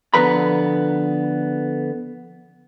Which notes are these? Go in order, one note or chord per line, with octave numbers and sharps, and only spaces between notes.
D3 F3 B3 B4 A#5 B5